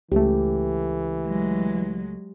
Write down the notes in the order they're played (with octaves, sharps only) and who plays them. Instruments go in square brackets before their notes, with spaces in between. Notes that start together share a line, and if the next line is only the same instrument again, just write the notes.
[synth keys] C#2 A3 [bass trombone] E3 [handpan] G4
[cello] F#3 G#3